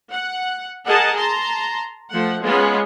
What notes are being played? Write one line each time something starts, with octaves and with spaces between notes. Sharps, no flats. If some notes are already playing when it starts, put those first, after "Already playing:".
F#5
G#4 A#4 D#5 F#5 A5
A5 A#5 C6
F3 A3 F#5
G#3 B3 C#4 F4